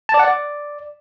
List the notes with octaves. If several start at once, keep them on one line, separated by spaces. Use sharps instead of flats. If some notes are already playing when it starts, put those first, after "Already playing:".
A5
D5
F#5
D5